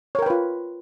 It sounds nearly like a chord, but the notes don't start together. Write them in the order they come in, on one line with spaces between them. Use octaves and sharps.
C#5 A#4 G5 B4 F4